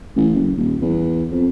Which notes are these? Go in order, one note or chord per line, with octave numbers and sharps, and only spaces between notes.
A1
F#1
D#1
E2
F2